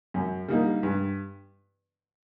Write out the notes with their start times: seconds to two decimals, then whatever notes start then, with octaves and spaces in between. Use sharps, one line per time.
0.14 F#2
0.48 D3 G3 A#3 D#4
0.83 G2